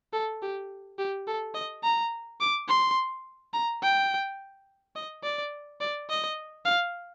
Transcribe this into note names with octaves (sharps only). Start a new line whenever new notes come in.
A4
G4
G4
A4
D#5
A#5
D6
C6
A#5
G5
D#5
D5
D5
D#5
F5